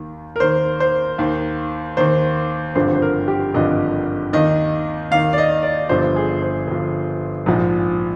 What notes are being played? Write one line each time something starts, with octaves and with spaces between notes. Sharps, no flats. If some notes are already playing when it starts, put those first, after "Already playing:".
Already playing: D#2 D#3
A#4
D#2 D#3 C5
C5
D#2 D#3
D#2 D#3 C5
G#1 G2 D3 F3 C5
C5
A#4
G4
G#1 G2 D3 F3 D#5
D#2 D#3 D#5
D#2 D#3 F5
D5
D#5
D5
G1 G2 F3 C5
G#4
C5
G1 G2 F3
A#1 G#2 F3